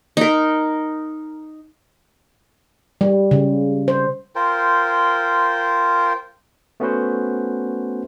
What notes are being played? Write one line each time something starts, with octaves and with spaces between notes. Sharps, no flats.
D#4 A#4
G3
C#3
C5
F4 A#4 C5 G5
A3 B3 C#4 F#4 B4 C5